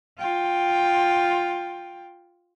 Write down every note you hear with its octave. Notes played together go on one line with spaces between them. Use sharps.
F4 G5